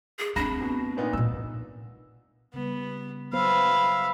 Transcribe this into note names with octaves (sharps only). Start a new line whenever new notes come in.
G#4
A3 C4 D4 B5 A#6
B2
A#2 B3 D#4
A#2 A3 E6
C#3 G3 B3
F#3 B3 C5 E5 F5 B5